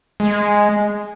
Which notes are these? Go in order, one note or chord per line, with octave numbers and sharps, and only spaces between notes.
G#3